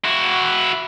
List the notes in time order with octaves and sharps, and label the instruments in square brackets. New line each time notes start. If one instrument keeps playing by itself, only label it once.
[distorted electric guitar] E4 F#4